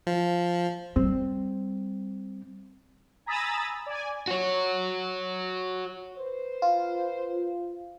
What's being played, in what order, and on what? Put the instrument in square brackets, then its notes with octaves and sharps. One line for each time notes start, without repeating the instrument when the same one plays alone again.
[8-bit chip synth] F3
[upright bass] G3 [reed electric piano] C4
[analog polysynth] G#5 A#5 B5 D#6 E6 A6
D5 G#5
[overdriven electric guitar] F#4 C#5
[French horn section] B4 C5
[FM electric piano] F4